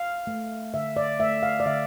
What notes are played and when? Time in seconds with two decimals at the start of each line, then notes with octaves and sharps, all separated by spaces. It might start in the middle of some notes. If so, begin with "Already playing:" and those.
Already playing: F5
0.27 A3
0.74 D3 E5
0.96 D5
1.20 A3 E5
1.43 F5
1.60 D5
1.66 D3 E5